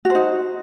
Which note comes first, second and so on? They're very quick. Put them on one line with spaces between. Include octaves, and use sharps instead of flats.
F#4 C5 D#4